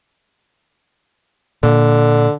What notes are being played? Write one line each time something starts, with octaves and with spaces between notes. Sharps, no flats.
A#2 D3